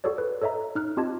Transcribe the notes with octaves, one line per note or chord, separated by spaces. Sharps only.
F#4 G#4 A4 C#5 D5
B4
A4 C#5 D#5 E5 A#5
D#4 F6 F#6
C4 F4 G4 D#5 A5 G#6